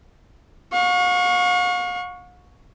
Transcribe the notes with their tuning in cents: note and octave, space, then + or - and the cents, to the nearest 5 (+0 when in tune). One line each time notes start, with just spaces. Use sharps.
F5 +45 C#6 +0